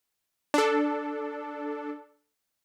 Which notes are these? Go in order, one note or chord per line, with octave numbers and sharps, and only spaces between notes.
D4 A4